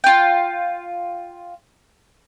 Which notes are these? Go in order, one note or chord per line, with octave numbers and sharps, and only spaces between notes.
F4 G5